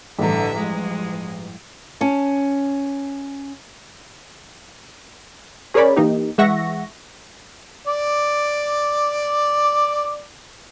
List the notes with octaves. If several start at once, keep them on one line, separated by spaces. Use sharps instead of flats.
A1 G2 D3 E3 E5 A#5
F3 G#3
C#4 A5
C#4 G#4 A#4 C#5 D5 B5
E3 A#3 D#4 G4
E3 G#3 E5 F#5 C#6 A#6
D5 D6